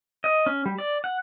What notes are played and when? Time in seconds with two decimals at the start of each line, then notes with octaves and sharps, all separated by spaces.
0.24 D#5
0.46 C#4
0.66 G3
0.78 D5
1.04 F#5